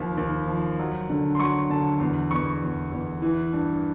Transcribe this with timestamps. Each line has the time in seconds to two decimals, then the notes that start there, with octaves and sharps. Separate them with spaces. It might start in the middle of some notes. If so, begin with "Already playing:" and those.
Already playing: D#2 F3
0.18 D#2
0.48 F3
0.79 F#3
1.09 D3
1.35 C6
1.39 F#3 C#6
1.70 D3 A5
2.00 E2
2.31 E2 C#6
2.62 E2
2.92 E2
3.22 E3
3.53 G2